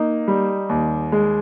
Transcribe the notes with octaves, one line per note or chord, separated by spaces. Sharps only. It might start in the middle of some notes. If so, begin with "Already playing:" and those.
Already playing: A#3 D#4
G3
D#2
G#3